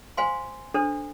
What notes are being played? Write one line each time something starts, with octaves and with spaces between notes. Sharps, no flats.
C5 F5 G#5 C6
D4 A4 C5